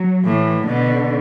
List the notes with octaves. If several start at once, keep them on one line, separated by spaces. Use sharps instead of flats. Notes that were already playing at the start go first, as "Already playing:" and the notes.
Already playing: F#3
A2 E3
B2 D3